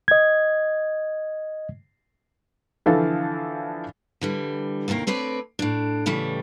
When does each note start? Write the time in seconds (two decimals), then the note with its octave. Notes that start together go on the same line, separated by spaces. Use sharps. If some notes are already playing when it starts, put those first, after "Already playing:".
0.08 D#5 G#6
2.86 D3 E3 F3 A4 F5
4.21 D3 E3 G3
4.88 D#2 C3 D#3 A#3 C4
5.07 A3 C4 B4 C#5 D5
5.59 A2 D4
6.06 A2 C#3 E3 G3 A3